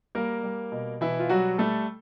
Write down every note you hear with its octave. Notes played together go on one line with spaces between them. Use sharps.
G3 A#3 A#4
G3
B2
B2 E3 E4
F4
F#3 G3 F#4
G3 A3 A4